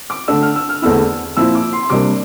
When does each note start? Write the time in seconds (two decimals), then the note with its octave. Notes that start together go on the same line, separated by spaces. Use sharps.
0.10 D6
0.28 D3 A3 D4 E6
0.42 F6
0.56 E6
0.69 F6
0.82 E2 D3 A3 C4 E4 E6
1.37 A#2 F3 C4 E4 E6
1.55 D6
1.73 C6
1.83 C6
1.90 C3 G3 A#3 D4 D6